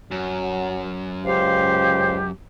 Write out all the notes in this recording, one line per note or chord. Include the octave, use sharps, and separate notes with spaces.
F#2 F#3
C#2 G4 C5 F5